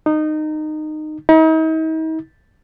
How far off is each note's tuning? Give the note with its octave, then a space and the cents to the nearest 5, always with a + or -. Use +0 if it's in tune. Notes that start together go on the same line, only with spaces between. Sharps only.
D#4 -20
D#4 +40